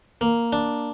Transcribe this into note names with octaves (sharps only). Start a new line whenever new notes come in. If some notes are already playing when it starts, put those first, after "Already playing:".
A#3
D4